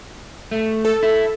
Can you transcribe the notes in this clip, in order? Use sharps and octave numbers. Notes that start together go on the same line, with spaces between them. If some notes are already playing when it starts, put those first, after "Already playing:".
A3
A4
E4